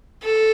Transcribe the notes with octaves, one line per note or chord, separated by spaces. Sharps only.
A4